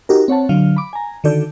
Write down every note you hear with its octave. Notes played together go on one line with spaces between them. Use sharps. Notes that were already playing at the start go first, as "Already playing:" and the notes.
D#4 F#4 G4 A#4
C4 C#5 F#5 A5
D3 F#3 F5 F6
B5 D6
G#5 A#5
D3 D#3 F#4 A4 D5 G6